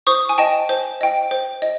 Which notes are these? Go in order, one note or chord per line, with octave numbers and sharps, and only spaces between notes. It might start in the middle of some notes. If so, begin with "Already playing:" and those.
C5 C#6 D#6
G#5
D#5 G5 A5
C5
D#5 G5
C5
D#5